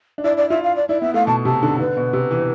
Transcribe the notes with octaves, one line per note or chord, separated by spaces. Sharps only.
D4
E4 D5
D5
F4 E5
F5
D5
E4 D5
B3 E5
A3 F5
B2 A5
C3 A5
D3
D3 B4
B2
C3
E3